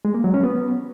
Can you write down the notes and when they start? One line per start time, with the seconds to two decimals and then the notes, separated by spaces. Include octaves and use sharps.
0.05 G#3
0.14 A#3
0.24 F#3
0.34 C#4
0.44 B3